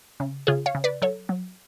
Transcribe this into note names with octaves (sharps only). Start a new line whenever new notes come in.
C#3
C#3 F4 G#4
C#5 F5
C#3
B4 D5
F#3 A4 C#5
F#3